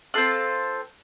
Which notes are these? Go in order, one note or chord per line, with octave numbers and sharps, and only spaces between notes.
C4 F4 A4 F#6